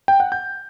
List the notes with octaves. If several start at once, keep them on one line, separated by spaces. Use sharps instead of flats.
G5
F#5
G6